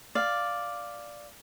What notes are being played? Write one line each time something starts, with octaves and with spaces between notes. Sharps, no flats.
D5 F5